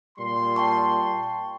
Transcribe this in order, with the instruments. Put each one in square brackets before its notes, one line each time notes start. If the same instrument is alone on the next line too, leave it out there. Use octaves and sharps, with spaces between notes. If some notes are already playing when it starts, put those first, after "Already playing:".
[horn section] A#2 G3 C6
[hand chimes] G5 A5 C#6